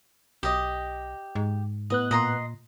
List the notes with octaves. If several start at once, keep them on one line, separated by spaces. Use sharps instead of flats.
B1 G4 D#5
G#2
A2 B3 D#5 F#6
A#2 D#5 A#5 C6